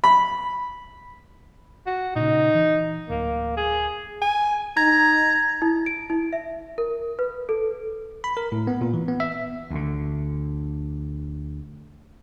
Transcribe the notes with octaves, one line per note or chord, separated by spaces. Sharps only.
B5
F#4
A#2 C#3 D#4
E3
D1 A#3
G#4
G#5
D#4 A#5 G#6
E4
D7
E4
E5
A#4
B4
A4
B5
A#4
A2
B3
A#2
E3
B3
E5
D2 D3